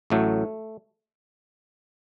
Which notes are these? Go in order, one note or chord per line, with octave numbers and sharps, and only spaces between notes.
A1 A2 F#3 A3